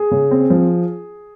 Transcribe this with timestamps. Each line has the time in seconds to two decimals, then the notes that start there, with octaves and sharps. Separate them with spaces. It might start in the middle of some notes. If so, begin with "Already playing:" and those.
Already playing: G#4
0.11 C#3
0.31 C4
0.50 F3